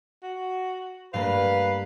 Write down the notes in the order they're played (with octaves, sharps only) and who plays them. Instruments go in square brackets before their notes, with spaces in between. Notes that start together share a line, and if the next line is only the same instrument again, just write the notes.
[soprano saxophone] F#4
[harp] G2 A3 A#3 [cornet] B4 [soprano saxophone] F5